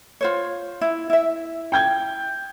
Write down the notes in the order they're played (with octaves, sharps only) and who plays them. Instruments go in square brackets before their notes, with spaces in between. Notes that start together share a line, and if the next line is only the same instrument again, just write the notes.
[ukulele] F4 C5 C#5
E4
E4 E5
[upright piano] G5 G6 G#6